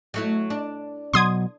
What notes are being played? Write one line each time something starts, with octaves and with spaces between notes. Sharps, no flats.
F#3 A3 E4
D4
B2 F#3 C6 D#6 G#6